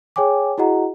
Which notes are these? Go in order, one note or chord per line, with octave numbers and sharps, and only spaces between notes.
G#4 C#5 G5 G#5 D6
E4 F#4 G#4 D#5 F#5 A#5